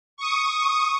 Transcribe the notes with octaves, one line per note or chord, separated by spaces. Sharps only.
C#6 D#6